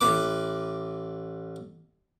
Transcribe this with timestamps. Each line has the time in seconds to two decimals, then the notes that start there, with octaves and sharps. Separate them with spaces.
0.01 A1 B4 D6